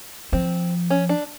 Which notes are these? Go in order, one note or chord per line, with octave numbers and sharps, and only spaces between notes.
F3 C4
C#4
D4